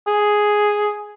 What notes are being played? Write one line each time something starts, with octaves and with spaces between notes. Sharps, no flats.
G#4